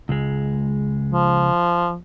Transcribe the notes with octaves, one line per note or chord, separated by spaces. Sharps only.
C#2 G#3
F3